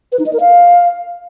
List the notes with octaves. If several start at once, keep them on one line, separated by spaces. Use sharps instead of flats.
B4
D#4
D#5
A#4
F5